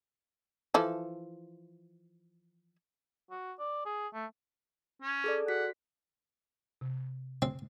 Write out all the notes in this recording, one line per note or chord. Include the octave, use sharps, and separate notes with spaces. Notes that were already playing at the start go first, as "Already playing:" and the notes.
E3 F3 A4
F#4
D5
G#4
A3
C#4
G#4 A4 D5
F#4 F#5 B6
C3
C4